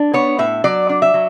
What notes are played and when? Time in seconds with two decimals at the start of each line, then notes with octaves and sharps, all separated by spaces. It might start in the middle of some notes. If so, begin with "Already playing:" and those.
Already playing: D4
0.14 B3 C#5
0.39 A2 E5
0.64 F#3 D5
0.89 D4
1.02 E5
1.14 F#3